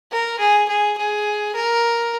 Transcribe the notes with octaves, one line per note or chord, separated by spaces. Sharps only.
A#4
G#4
G#4
G#4
A#4